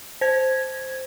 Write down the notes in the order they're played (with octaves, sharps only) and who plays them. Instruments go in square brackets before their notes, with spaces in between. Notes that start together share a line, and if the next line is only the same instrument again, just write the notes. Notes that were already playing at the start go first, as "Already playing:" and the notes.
[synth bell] C5 G#6